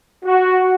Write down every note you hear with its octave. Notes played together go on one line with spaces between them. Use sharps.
F#4